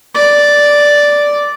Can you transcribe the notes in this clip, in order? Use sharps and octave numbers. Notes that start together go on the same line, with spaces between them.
D5